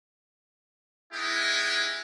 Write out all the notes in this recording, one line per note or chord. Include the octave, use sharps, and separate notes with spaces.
G#3 B3 D#4 E4 G4 G#4